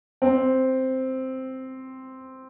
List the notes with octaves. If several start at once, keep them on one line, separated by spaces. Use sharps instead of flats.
C4